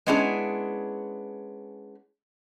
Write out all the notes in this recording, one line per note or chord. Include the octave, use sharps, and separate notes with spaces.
G#3 B3 C#4 D4 E4 G#4